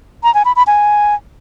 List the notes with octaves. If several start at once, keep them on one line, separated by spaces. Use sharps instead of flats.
A#5
G#5
B5
B5
G#5